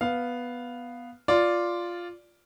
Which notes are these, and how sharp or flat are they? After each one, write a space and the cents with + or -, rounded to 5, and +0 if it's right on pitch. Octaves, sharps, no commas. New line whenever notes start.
B3 +0 F5 +0
F4 +0 D5 -5